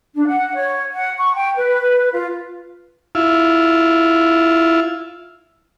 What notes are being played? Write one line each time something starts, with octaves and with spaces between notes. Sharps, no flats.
D4
F#5
C#5
F#5
C#6
G5
B4
F4
E4 F4